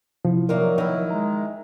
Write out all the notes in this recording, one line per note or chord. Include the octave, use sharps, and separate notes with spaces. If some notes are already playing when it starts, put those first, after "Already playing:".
C3 F3 E4
D#3 F#3 A#3 A#4 D5 E5
D#3 E4
G#3 A#5